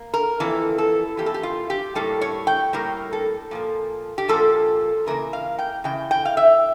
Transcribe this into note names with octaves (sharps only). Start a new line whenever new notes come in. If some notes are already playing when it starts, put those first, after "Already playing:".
Already playing: A#3
A#4
F2 E3 A#3 A4
A4
F2 E3 A#3 G4
A4
G4
F4
G4
A2 G3 A#3 A4
C#5
G5
A2 G3 A#3 A#4
A4
A#2 F3 A#3
G4
A#2 F3 A#3 A4
C#3 E3 A#3 A#4
F5
G5
C#3 E3 G5
G5
F5
E5